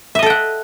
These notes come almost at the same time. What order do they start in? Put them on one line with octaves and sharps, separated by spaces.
E5 D#5 A4 G5 F#5